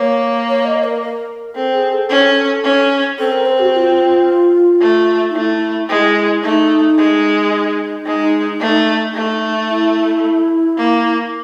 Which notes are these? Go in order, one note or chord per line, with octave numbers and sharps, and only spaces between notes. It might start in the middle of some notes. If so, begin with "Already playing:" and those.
Already playing: A#3 C#5
C#5
D#5
A#4
A#4
C4 A4
G#4
A4
C#4
C#4
C4 A4
A#4
C5
F#4
F4
A3
D#4
A3 E4
G#3 E4
A3 D#4
G#3
D#4
G#3
A3
A3
E4
A#3